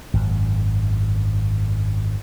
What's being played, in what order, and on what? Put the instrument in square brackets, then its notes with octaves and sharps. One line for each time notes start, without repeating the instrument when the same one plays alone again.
[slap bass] G#1 F#2